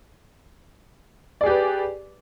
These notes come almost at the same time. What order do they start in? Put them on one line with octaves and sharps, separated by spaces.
D5 G#4 G4 B4